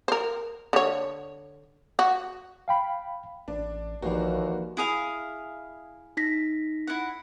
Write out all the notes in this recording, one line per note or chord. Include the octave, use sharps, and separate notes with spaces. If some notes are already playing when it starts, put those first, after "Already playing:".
A#4 C5
D3 C#5
F#4
F5 G5 B5
A1 D4
A#1 D#2 E3 F3 F#4 D5
E4 G#4 F5
D#4 A#6 B6
E4 F#5